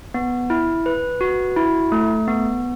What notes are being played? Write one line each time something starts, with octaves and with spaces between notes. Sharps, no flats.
B3
E4
B4
F#4
E4
A3
B3